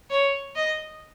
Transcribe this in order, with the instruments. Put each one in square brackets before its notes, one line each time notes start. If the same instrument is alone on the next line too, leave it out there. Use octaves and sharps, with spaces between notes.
[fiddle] C#5
D#5